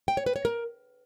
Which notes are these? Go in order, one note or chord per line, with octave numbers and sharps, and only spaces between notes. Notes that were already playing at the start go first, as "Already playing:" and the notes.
G5
C#5
B4
C#5
A#4